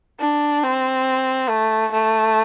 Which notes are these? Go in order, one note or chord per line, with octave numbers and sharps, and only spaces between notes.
D4
C4
A3
A3